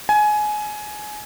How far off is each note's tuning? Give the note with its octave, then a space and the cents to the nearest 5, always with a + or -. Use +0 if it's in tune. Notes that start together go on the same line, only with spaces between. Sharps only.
G#5 +20